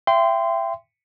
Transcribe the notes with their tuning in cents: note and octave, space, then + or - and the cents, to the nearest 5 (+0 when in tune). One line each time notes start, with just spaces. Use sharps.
E5 +30 G5 +0 C6 -20